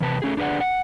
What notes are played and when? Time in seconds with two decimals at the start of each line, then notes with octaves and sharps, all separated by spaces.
0.01 E2 C3 B4 A5
0.22 A3 C#4 G#4
0.37 D4 G#4 B4 D5 F#5
0.60 F#5